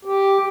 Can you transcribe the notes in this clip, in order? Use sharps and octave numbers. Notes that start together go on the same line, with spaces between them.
G4